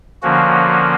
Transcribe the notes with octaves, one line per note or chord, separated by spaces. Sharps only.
D3 F3 A#3 C#4 F#4